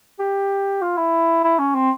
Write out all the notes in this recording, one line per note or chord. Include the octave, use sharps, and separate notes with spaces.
G4
F4
E4
E4
C#4
C4